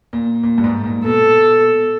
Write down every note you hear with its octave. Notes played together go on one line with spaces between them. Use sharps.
A#2
A#2
G2
G#2
A#2
B2 A4